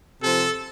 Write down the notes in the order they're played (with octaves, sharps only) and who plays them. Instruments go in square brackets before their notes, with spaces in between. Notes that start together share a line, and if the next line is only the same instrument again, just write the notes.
[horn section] C3 F3 A4